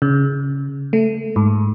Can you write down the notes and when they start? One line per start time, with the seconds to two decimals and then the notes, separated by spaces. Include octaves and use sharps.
0.02 C#3
0.93 A3
1.36 G#2